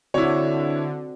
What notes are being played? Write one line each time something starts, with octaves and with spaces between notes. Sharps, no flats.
D3 C4 E4 F#4 C#5 D5